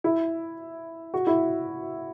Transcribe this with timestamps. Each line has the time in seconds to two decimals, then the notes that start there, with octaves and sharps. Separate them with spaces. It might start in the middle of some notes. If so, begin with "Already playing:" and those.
0.04 E4
1.14 F#4
1.27 E4